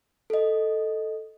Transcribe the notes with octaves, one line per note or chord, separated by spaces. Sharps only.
A4 D#5